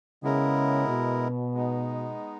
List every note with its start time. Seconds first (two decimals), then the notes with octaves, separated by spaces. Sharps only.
0.23 C#3 G#3 B3 E4 A#4
0.88 B2
1.54 G#3 B3 D#4